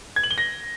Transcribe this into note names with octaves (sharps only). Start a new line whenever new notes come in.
G#6
F#7
G7
A#6